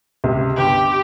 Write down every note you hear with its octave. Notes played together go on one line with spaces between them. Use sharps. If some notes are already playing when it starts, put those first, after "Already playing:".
C#2 C3
G1 G4